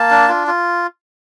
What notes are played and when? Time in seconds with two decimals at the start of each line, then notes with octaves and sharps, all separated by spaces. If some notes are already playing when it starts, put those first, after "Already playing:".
Already playing: A#3 A5
0.11 D4
0.28 F4
0.47 F4